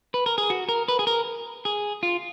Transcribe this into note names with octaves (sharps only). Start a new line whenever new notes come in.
B4
A#4
G#4
F#4
A#4
B4
G#4
A#4
G#4
F4